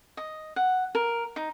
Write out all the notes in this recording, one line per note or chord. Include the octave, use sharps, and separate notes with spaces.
D#5
F#5
A#4
D#4